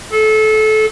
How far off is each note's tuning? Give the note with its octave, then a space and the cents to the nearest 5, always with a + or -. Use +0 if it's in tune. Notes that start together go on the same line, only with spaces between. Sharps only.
A4 -25